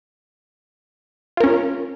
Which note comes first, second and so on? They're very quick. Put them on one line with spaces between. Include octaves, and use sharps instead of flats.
F4 A#4 C#4